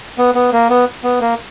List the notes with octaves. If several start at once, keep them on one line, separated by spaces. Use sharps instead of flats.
B3
B3
A#3
B3
B3
A#3